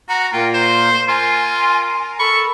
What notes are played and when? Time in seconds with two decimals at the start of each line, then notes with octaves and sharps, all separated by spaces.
0.09 F#4 F#5 A#5
0.33 A#2 A#3 F4 G5
0.54 C5 C6
1.09 F4 A#4 G#5 C6
2.19 A4 B5 C#6